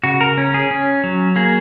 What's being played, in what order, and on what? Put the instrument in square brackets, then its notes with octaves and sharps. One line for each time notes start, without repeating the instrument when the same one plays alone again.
[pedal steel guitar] C#3 F#4
A#4
C#4
G#4
C#4
F#3
A#3 G#4